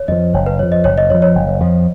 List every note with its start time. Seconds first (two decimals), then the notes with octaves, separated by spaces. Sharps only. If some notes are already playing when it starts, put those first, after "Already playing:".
Already playing: C#5
0.08 F2 F3 D#5
0.34 F#1 C#5
0.46 B4
0.59 F2 F3 C#5
0.72 D#5
0.84 F#1 C#5
0.98 D#5
1.10 F2 F3 C#5
1.22 C#5
1.35 F#1
1.60 F2 F3